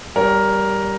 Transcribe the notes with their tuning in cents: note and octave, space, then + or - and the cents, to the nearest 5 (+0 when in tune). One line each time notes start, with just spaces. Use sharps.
G3 +0 A#4 +5 C#5 +35